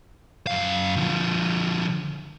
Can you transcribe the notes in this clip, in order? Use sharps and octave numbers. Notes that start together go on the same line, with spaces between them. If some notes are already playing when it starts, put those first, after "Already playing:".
F#2 F5
D3 F3